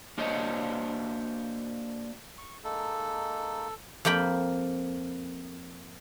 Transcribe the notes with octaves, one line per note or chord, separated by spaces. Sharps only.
A#3 D4 F#4 C5 C#5 D#5
C#6
G#3 A#3 D#4 A4
F2 A#3 G5 B5